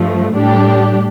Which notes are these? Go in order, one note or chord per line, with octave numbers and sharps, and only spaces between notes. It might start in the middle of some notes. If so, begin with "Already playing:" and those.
Already playing: G2 F3 A3
A2 G3 D4 G4